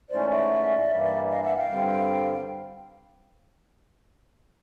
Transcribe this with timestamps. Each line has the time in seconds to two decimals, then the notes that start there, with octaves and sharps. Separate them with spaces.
0.10 G#2 E3 A3 C#4 C5 D5
0.30 D5 E5
0.90 G2 E3 G3 A#3
1.30 D#5 F5
1.43 E5 F#5
1.57 F5 G5
1.71 G2 D3 G3 C4